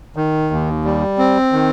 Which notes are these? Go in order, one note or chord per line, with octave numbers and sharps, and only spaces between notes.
D#3
D#2
G3
C4
D#3